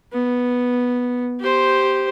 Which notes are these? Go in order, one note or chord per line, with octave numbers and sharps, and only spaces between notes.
B3
G4 C5